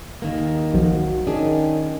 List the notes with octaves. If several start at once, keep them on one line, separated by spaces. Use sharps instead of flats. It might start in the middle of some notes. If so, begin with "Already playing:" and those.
D#2 D#3 A#3
B1 F3 F#4
D#3 C#4 D4 G#4